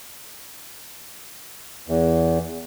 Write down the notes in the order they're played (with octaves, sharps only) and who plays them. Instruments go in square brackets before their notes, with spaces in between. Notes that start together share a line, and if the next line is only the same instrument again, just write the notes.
[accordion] E2